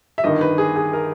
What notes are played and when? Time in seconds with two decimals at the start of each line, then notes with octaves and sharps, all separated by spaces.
0.18 E5
0.24 G1 G2 D#3 D#5
0.41 B4
0.58 G#4
0.76 G#4
0.93 A#4